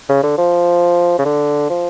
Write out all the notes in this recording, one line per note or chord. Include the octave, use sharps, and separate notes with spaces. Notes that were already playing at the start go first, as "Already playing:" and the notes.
C#3
D3
F3
C#3
D3
F3